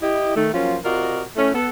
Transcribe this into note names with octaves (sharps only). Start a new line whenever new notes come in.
E4 G4 D#5
D#3 A3
F3 F#3 A#3 C#4 F4
C3 F4 F#4 A#4 D5 D#5
A3 C#4 E4
B3 A4